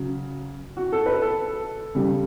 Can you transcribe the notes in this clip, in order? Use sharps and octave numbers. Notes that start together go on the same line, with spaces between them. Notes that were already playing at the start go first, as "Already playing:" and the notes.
Already playing: C#3 F#3
F#4
A4
B4
A4
C#3 G3